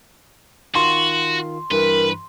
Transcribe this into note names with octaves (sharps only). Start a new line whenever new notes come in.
D#3 F4 F#4 C6
G2 E3 A#4 B4